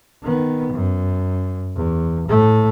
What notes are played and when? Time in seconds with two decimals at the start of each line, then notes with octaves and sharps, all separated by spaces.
0.23 D#3 B3
0.72 F#2
1.76 E2
2.28 A2 A3